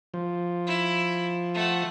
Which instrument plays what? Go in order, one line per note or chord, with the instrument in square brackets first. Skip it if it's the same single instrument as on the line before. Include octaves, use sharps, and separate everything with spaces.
[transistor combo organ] F3
[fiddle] E4
A3 F#5